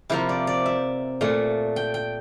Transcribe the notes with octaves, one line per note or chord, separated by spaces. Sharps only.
C3 F3 A#3 E4
D5
D5
E5
A#2 A3
G5
G5